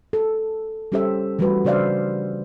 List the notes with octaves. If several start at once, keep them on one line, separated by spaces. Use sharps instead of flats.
A4
G3 C#4 G4 A4 C5 E5
E3 F3 G3 A3 F#4 B4
C#3 D4 C5 D5 E5 F5